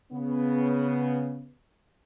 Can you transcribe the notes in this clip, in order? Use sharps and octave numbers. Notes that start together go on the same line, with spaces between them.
C#3 B3